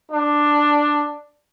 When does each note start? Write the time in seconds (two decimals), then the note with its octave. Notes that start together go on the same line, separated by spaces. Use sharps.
0.12 D4